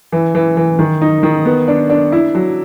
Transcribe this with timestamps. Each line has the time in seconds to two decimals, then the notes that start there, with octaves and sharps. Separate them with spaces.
0.12 E3
0.35 E3
0.57 E3
0.79 D#3
1.01 D#4
1.23 D#3
1.45 B3
1.68 D4
1.90 D4
2.12 E4
2.35 F#3